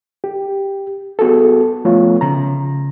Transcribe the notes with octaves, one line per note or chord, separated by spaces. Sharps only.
G4
B3 F#4 G#4 A4
F3 A3 B3 F4 C#5
C#3 A#5